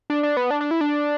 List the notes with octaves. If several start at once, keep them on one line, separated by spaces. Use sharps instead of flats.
D4
D4
B3
D4
D4
E4
D4